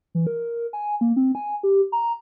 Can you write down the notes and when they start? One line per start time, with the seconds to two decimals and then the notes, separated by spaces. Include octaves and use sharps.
0.15 E3
0.27 A#4
0.73 G#5
1.01 A#3
1.16 C4
1.35 G#5
1.63 G4
1.92 A#5